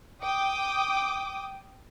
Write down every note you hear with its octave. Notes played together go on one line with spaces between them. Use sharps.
G5 D6 D#6